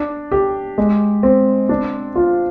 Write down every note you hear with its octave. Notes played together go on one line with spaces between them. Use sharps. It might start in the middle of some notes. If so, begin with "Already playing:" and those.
Already playing: D4
G4
G#3
C4
D4
F4